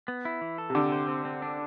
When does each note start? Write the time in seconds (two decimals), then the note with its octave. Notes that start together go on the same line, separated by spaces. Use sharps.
0.08 B3
0.25 E4
0.41 E3
0.58 A4
0.70 C3
0.75 D3 G4
0.92 C5
1.08 C4
1.25 C4
1.42 D4